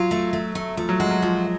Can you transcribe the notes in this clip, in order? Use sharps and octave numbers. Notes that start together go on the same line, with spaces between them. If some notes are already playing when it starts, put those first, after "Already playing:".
Already playing: F#3 F4
A3
A3
A3
F3 A3
F#3
G#3 F#4
F#3
F3 A3